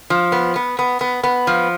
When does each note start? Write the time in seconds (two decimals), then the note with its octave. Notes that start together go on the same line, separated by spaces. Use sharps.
0.10 F3
0.32 B3
0.56 B3
0.79 B3
1.01 B3
1.24 B3
1.47 F3